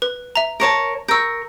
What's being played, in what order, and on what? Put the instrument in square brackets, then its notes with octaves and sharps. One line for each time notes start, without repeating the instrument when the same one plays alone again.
[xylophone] B4
E5 A#5
[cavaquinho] A#4 C#5 A5
[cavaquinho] A#4 C#6 [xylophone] E6 G6